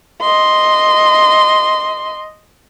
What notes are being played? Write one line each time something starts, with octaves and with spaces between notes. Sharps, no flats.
D#5 C6